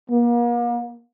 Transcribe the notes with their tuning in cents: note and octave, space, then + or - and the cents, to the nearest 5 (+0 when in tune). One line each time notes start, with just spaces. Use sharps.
A#3 +40